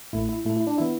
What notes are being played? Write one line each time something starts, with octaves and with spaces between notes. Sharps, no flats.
A1 A2 A3 E4
E4
A2 A3 E4
E4
D4
E3 B3 E4